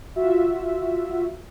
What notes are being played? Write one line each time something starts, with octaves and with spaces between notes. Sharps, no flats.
F4 F#4 E5